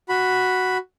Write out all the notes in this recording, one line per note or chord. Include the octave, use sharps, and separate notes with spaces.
F#4 B5